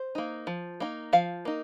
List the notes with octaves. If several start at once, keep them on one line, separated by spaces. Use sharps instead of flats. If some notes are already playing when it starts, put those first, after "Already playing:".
Already playing: C5
A#3 D#4
F3
A#3 D#4
F3 F5
A#3 D#4